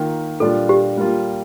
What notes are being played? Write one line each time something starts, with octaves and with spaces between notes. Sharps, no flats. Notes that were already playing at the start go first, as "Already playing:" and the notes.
Already playing: D#3 A#3 F4
A#2 G3 D4 F4 A4
G4
G3 A#3 F4